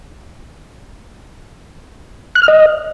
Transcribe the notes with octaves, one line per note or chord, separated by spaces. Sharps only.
F#6
F6
D#5